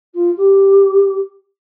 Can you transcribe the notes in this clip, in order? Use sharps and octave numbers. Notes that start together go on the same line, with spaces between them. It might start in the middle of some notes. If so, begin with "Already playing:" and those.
F4
G4